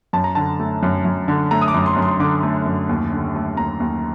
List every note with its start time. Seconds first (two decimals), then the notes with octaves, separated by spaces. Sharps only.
0.13 F#2 A5
0.24 A#5
0.35 D3 A5
0.59 A3
0.83 F#2
1.05 F#2
1.28 D3
1.51 A3 A#5
1.61 D#6
1.68 D6
1.74 F#2
1.86 C6
1.96 F#2
2.02 C6
2.20 D3 D6
2.43 A3
2.66 F#2
2.89 D#2
3.12 D3
3.35 A3
3.57 D#2 A#5
3.80 D#2